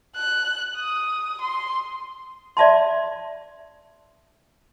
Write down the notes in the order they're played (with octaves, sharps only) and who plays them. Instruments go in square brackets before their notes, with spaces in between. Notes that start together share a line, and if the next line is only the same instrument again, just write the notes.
[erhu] F#6
D#6
C6
[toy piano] D5 E5 A5 C6